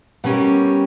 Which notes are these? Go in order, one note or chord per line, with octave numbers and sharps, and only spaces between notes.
B2 G3 C#4 G4 A#4